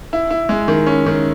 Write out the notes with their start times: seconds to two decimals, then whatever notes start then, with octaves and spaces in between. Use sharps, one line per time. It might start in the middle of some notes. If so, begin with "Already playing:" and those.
0.13 E4
0.31 E4
0.49 G#3
0.68 D#3
0.87 C#4
1.06 D#3